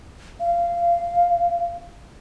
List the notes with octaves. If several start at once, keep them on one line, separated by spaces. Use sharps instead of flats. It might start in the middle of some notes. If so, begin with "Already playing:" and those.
F5